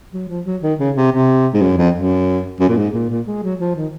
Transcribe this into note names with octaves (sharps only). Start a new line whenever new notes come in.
F#3
F3
F#3
D#3
C#3
C3
C3
G#2
F#2
F2
F#2
F#2
A#2
G#2
A#2
A#2
G#3
F#3
F3
D#3